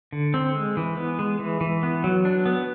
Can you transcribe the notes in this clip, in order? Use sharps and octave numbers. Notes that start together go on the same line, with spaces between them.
D3
C4
G#3
E3
B3
G#3
E3
E3
B3
F#3
D4
B3